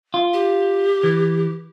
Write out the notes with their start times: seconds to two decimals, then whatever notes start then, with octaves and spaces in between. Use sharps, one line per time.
0.14 F4
0.33 G4
1.04 E3